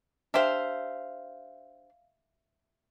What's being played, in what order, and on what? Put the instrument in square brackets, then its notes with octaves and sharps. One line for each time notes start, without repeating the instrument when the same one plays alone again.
[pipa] D4 G4 C5 [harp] E5 F5